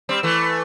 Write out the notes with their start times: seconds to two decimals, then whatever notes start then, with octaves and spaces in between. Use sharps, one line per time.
0.09 G3 C4
0.23 E3 A3